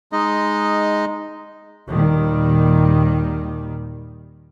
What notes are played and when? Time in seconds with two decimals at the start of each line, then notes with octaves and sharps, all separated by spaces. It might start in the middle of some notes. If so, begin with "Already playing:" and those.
0.12 G#3 D#4 D#5
1.89 D#2 A#2 D#3 G3